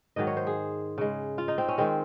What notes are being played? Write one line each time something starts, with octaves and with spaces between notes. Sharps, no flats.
G#2 D#3 F#3 D#5
C#5
C5
G#4
C#3 G#3
F4
D#4
C4
C#4
D#3 G#3 C4